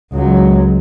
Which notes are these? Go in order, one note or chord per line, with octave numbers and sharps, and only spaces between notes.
C#2 F#3